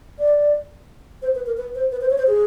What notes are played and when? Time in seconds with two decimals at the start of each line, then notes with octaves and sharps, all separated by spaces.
0.19 D5
1.22 C5
1.35 B4
1.46 A#4
1.57 B4
1.75 C5
1.92 B4
2.01 C5
2.10 C#5
2.18 C5
2.27 G#4